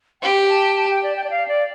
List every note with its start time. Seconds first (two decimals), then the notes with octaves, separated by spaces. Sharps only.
0.22 G4 G5
0.49 A5
0.76 A5
0.90 G5
1.03 D5
1.16 G5
1.24 D5
1.30 F5
1.48 D5